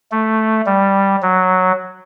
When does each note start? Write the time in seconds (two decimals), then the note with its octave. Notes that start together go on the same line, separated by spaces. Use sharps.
0.12 A3
0.66 G3
1.22 F#3